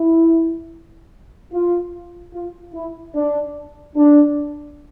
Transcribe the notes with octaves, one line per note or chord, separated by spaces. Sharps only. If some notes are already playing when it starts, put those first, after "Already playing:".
Already playing: E4
F4
F4
E4
D4
D4